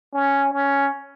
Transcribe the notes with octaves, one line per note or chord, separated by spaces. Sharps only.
C#4
C#4